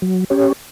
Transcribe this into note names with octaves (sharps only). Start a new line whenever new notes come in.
F#3
C#4 G4 C#5